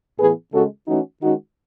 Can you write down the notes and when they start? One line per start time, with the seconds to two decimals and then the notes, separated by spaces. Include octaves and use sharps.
0.18 A2 E3 B3 G#4 B4
0.53 C#3 G#3 C#4 F#4 A4
0.87 E3 A3 C#4 D#4 F#4
1.22 D#3 G#3 C#4 D#4 F#4